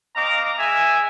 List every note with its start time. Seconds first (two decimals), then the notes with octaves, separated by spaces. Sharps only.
0.16 C4 D#5 F5 A#5 D6
0.58 G#3 E5 G#5